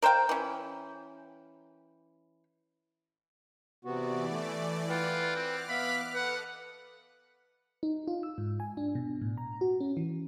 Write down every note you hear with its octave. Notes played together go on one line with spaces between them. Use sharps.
A#4 C5 F5 G5
E3 C#4
C3 E3 B3 F#4 D5
A3
F4 B4 F#5 G5
C4 D6 F6 F#6
B3 E5 F5 B5
A4 B4 D#5 F#5
D#4
F4
E6
G#2
G#5
D4
B2
A2
A#5
F#4
C#4
E3